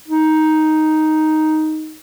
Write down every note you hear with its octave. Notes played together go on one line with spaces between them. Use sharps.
D#4